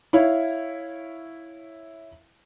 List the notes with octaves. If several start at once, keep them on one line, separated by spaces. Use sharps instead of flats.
E4 C#5 F5